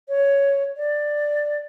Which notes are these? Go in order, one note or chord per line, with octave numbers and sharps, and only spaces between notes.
C#5
D5